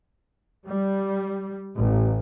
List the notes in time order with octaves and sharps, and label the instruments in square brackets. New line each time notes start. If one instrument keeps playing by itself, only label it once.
[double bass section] G3
A1